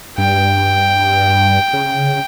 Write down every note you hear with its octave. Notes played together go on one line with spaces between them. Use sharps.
G2 G5
C#3